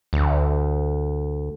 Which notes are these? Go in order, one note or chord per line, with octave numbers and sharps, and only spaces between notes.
D2